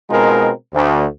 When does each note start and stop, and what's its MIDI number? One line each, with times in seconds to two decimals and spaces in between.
0.10 0.50 47
0.10 0.50 56
0.10 0.50 60
0.10 0.50 63
0.10 0.50 65
0.10 0.50 70
0.74 1.05 38